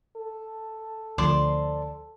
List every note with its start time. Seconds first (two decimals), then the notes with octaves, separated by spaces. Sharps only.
0.16 A4
1.18 D2 F3 C5 D5 C6